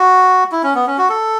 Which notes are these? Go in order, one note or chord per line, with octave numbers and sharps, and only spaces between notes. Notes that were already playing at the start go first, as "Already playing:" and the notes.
Already playing: F#4
E4
C#4
B3
C#4
F#4
A4